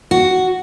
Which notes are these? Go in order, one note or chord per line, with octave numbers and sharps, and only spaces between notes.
F#4